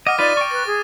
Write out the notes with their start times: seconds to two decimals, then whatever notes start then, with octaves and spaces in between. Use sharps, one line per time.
0.07 D#5 F#5 D6 F6 A#6
0.19 D#4 F4 B4 D5 A6 D#7
0.37 G5 C#6
0.51 B4 A6
0.66 G#4